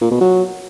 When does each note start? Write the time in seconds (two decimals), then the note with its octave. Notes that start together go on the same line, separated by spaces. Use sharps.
0.01 A#2
0.11 B2
0.21 F#3